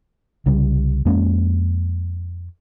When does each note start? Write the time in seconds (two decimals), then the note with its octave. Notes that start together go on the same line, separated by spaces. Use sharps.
0.46 C2 C#3 G3
1.05 F2 G#3 A#3 C#4